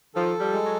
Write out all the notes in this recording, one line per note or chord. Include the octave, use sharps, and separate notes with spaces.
D#3 F3 A4
F3 G3
G#3
F#3